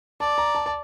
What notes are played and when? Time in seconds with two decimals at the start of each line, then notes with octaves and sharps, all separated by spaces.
0.20 D5 A5
0.38 A#5
0.55 A5
0.66 A5